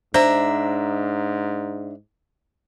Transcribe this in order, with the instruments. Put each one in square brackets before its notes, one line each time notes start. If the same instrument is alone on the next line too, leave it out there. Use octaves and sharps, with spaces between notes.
[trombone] G#2 [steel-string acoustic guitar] D4 E5 [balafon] C5 [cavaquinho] A#5